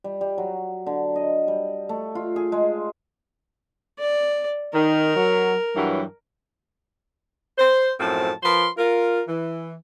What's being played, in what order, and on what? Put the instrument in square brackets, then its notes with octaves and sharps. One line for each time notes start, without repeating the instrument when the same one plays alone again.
[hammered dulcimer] G3
G3
F#3
D3
D#5
G3
A3
F4
G#4
G#3
[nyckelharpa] D5
[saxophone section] D#3 [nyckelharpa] A#4
[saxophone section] F#3
G2 E3 F#3
[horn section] C5
F#2 A2 F3 C4 A5
F3 A#4 B4 C6
F4 A#4
E3